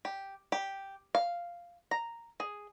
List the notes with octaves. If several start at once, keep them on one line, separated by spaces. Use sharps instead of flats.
G4
G4
F5
A#5
G#4